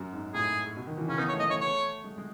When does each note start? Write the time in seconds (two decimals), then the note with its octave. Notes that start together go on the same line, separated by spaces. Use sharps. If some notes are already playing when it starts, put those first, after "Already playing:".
Already playing: F#2
0.13 G#2
0.34 A2 G#4
0.77 B2
0.87 D#3
0.97 E3
1.08 C#3 C#4
1.18 B3 D#4
1.29 C#5
1.33 A3
1.39 D#5
1.47 A3 C#5
1.61 C#5
2.04 G#3
2.18 G#3